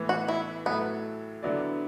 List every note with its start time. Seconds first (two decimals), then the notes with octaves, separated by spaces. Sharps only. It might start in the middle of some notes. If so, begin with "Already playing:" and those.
Already playing: A2 E3 B3
0.09 F#4
0.28 E4
0.66 A2 F#3 A3 B3 E4
1.43 D3 F#3 B3 E4 D5